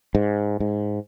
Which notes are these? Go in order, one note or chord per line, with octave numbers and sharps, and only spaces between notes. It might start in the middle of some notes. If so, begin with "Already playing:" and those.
G#2
G#2